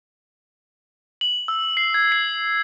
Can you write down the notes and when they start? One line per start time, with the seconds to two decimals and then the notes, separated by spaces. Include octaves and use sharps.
1.21 F#7
1.48 E6
1.77 C7
1.94 G#6
2.12 C7